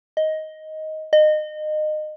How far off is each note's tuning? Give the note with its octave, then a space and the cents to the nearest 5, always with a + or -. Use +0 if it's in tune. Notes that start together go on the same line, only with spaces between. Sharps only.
D#5 +10
D#5 -25